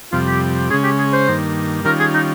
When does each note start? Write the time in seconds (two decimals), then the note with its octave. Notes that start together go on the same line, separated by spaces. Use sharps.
0.12 F2 C3 G3 F4
0.27 G4
0.70 C#3 G#3 C#4 G#4
0.84 G4
0.98 G#4
1.13 C5
1.28 G2 D#3 A#3
1.85 D#3 G3 C#4 F4 A#4
1.99 G#4
2.14 D#4